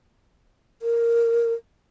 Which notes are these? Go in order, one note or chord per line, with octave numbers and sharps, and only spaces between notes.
A#4